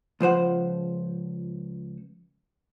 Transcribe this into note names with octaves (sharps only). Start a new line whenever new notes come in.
C#2 F3 C5 F#5